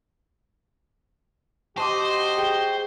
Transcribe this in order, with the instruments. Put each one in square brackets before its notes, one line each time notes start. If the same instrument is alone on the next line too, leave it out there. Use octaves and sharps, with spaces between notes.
[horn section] F#4 G4 D#5 [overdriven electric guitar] C5 [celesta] A5 C6 D6
[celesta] G#4 G7 [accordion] G5